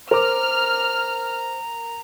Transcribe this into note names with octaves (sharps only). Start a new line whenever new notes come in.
A#4 C5 A#5 D6 F6